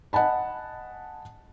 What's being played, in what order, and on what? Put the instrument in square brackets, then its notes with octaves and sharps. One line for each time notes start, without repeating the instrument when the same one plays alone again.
[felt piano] D#5 F#5 G#5 A5 B5